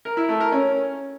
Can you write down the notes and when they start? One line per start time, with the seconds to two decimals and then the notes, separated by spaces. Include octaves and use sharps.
0.05 A#4
0.17 E4
0.29 A3
0.40 A#4
0.52 C#4